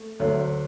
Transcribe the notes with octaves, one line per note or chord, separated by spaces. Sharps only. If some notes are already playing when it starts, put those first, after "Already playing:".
Already playing: A3
D2 D3 F#3